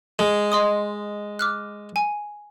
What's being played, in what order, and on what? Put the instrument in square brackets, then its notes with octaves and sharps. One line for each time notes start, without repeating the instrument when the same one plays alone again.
[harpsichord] G#3
[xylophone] D#5 C6 D#6
D6 F6 F#6
G#5